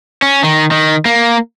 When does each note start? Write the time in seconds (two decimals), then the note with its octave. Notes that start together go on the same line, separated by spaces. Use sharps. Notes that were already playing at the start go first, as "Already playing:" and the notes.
0.22 C#4
0.44 D#3
0.71 D#3
1.05 A#3